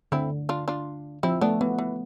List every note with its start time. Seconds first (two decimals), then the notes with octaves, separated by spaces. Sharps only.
0.12 D3 C4 E4
0.49 D4 F4
0.68 D4 F4
1.23 F3 C4 E4
1.41 A3 B3 D4
1.61 E3 B3
1.79 E3